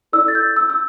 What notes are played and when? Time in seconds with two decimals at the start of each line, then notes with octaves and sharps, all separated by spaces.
0.13 E4 A4 D5 E6
0.28 A6
0.35 G6
0.56 E6
0.70 E6